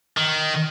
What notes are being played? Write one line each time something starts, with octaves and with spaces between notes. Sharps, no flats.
D#3